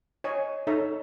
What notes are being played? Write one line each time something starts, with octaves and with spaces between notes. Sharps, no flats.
C#5 D#5 G#5
D#4 A4 C#5 E5 A#5